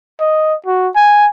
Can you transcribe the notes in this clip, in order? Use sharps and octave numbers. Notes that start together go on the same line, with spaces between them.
D#5
F#4
G#5